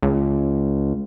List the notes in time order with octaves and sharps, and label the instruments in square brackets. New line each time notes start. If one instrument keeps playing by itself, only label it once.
[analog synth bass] C#2